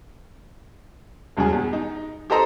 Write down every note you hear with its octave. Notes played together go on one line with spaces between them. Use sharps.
E1 E2 G2 G3 G#4
E2
D#4
G4 A4 C5 D#5 A#5